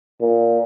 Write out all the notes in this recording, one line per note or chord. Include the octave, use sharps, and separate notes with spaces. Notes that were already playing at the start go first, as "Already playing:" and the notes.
A#2